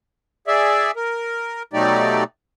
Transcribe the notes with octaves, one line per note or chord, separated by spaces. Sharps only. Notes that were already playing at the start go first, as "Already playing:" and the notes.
G#4 D5 E5
A#4
B2 F#3 A3 D#4 G4 D5